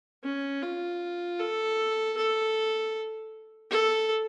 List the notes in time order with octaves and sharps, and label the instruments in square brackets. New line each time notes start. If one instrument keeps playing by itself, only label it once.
[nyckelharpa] C#4
F4
A4
A4
A4